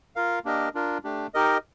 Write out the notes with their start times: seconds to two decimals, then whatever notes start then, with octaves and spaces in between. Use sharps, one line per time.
0.16 F4 A#4 F5
0.45 A#3 D4 G4 A#4 D#5
0.74 D4 F4 A#4
1.04 A3 D4 G4
1.34 D#4 G4 A#4 D#5